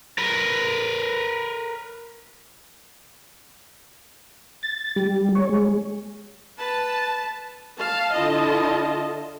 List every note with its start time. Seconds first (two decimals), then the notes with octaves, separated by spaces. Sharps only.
0.18 A#4 B4
4.63 A6
4.96 G3
5.35 C#5
5.49 G#3
6.58 B4 A5
7.79 F5 A5
8.14 D3 E4 F4 D#5 A5